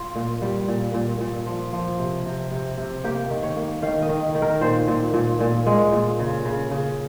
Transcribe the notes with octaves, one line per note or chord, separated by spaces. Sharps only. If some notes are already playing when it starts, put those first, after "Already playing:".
Already playing: F4
A#2
G3
A#2
A#2
A#2
F3
F3
C3
C3
C3
C3
A#3 G4
D#3
C#5
A#3
D#3 F5
D#5
D#3
D#3
A#4
A#2 C5
A#2
A#2
A#2
G#3
A#2
C#3
C#3
C#3